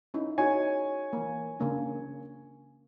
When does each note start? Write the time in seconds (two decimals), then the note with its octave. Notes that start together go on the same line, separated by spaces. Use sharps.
0.14 C#4 D#4 E4
0.38 D#4 F#4 G#4 C#5 G#5
1.13 E3 A#3
1.60 C#3 A#3 D4